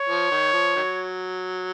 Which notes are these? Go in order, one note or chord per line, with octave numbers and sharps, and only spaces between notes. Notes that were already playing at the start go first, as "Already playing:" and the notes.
Already playing: C#5
F3
D#3
F3
D#3 F#3